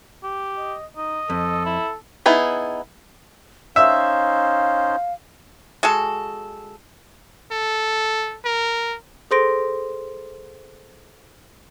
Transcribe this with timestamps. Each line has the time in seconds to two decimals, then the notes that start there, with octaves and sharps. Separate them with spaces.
0.23 G4
0.58 D#5
0.97 D#4 D#5
1.30 F2 A4
1.65 E4
2.26 B3 D#4 E4 G#4
3.76 C#4 D#4 C5 E5 F5
5.83 G#3 F#4 A4
7.52 A4
8.45 A#4
9.31 G#4 A4 C5 C6 A#6 D7